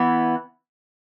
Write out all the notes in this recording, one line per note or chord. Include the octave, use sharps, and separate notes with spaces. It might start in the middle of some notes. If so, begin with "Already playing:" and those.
Already playing: E3 B3 E4